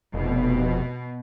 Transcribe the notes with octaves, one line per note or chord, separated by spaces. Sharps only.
F1 B2